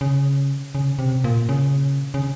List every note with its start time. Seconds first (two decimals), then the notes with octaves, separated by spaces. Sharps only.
0.01 C#3
0.75 C#3
0.99 C3
1.24 A#2
1.49 C#3
2.14 C#3